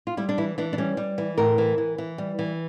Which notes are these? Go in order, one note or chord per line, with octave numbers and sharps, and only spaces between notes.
F4
G3 E4
D4
E3 E4
E3 D4
D4
G3 C#4
G3
E3
A2 A#4
E3
E3
E3
G3
E3